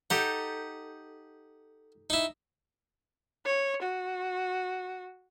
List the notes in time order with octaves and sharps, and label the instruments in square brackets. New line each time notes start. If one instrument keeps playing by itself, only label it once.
[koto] D#4 G4 A4 [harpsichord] F#5
[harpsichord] D#4 E4
[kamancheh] C#5
F#4